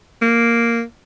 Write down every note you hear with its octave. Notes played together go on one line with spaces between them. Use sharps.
A#3